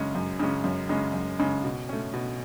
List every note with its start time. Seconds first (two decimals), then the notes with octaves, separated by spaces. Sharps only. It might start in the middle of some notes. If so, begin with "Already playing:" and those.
Already playing: F#2 C#3 G#3 C#4
0.15 F#2
0.40 C#3 G#3 C#4
0.64 F#2
0.89 C#3 G#3 C#4
1.14 F#2
1.39 C#3 G#3 C#4
1.64 B2
1.89 A3 C#4
2.14 B2